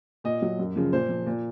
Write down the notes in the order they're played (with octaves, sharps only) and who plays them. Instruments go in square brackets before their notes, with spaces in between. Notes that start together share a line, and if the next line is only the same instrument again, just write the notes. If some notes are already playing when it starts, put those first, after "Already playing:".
[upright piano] A#2 D#5
F#3
F#2
C#3 F3
A#2 C5
F3
A#2